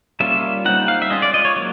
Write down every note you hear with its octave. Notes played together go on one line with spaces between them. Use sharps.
G3 A#3 C#4 F4 E5
G3 C4 D#4 F#5
F5
E5
G#3 C#4 F4 D#5
D5
D#5
C#5
F#3 A#3